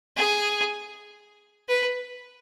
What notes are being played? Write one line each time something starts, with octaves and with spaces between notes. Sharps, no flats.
G#4
B4